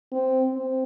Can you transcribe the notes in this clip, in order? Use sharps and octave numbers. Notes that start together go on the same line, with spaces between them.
C4
C4